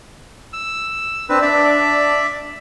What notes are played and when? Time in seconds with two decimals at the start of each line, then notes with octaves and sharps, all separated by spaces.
0.53 E6
1.29 C4 D4 B4
1.42 D4 D5 E5